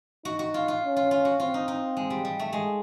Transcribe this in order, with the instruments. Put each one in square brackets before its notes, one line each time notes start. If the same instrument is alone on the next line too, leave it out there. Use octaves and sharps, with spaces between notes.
[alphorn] D#4 [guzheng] F#4
[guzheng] F#4
F4
F4
[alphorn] C#4
[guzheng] F4
F4
F#4
[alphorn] C4 [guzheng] F4
[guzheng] D#4
D#4
G#3
G3
G3
A3
G#3